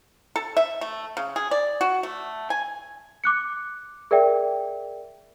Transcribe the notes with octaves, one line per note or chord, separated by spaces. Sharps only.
A4
E5
A3
C#3
G#4
D5
F#4
A3
G#5
D6 F#6 C#7
G#4 A#4 D5 E5 G5